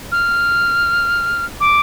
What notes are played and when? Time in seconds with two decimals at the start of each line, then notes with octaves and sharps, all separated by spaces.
0.12 F6
1.60 D6